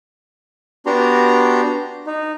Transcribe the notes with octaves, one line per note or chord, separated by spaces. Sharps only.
B3 D4 F#4 G4 A#5 C6
D#4